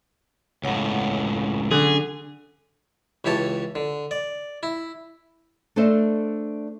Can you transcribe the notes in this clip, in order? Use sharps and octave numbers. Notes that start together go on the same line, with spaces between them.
C#2 A2 C#5 F#5
D3 F#3 C#4 G#4 A4
C#2 E3 G4 C#5 A5
D3
D5
E4
A3 D4 A4 C5 D#5 E5